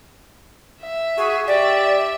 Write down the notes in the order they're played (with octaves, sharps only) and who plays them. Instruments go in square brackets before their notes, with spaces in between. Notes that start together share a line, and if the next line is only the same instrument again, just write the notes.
[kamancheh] E5
[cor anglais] F#4 [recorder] G#4
[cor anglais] G4 [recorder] D5 [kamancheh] E5